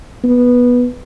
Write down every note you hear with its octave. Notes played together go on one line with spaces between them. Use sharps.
B3